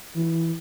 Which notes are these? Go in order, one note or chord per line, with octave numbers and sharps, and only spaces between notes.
E3